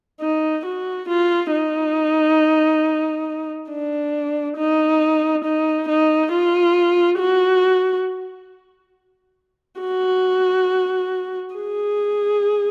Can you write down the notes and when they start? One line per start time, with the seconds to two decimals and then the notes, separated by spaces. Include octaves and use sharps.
0.20 D#4
0.65 F#4
1.08 F4
1.52 D#4
3.70 D4
4.57 D#4
5.44 D#4
5.88 D#4
6.32 F4
7.19 F#4
9.81 F#4
11.55 G#4